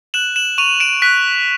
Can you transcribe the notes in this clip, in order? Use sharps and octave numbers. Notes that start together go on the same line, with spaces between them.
F#6 E7 F#7
E7 F#7
C#6 D#7 F7
D7 E7
F#6 B6